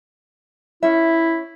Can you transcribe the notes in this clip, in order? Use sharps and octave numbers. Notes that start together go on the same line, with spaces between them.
C#4 E4 E5